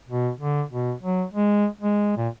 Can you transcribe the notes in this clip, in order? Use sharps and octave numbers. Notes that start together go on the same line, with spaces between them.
B2
D3
B2
F#3
G#3
G#3
A#2